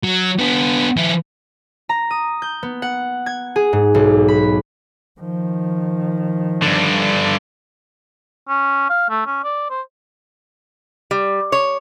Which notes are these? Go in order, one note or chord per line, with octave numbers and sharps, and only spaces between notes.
F#3
B3 D4
F3 E4
A#5
D#6
G6
B3
F#5
G#6
G#4
G#2
B1
B5
D#3 F3
G2 D3
C#4
F5
A3
C#4
D5
C5
G3
C#5